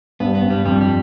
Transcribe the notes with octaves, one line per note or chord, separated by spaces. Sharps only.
G2 B3
B3
G2
G3
F2 G3
G3